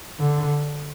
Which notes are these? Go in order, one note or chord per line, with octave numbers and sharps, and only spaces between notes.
D3